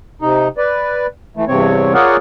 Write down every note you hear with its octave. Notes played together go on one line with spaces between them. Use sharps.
C3 D#4
B4 D5
E3 A3
E2 G2 C3 C4 C#5
F4 G#4 A#4 C#5 D5 F#5